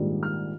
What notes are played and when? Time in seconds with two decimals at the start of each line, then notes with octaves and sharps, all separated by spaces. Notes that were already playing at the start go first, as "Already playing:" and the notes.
Already playing: A#1 G#2 D#3 G3 D4
0.23 F6